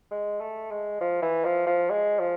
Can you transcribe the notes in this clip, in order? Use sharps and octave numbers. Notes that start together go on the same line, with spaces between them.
G#3
A3
G#3
F3
E3
F3
F3
G#3
F3